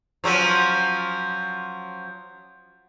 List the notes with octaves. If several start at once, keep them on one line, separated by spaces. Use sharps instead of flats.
F3 F#3 C#4